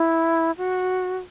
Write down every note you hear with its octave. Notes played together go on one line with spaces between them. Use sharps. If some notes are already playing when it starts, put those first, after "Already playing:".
Already playing: E4
F#4